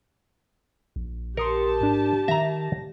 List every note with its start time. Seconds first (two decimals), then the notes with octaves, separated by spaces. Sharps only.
0.96 A#1
1.37 G4 A#4 A5 C6 D#6 C#7
1.80 G#2 D4
2.28 D#3 E5 A#5 A#6